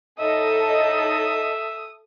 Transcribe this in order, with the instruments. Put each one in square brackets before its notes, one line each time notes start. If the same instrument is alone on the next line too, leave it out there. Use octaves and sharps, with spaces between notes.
[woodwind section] A2 D#4 D#5 [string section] A4 [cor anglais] E5 [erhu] D#6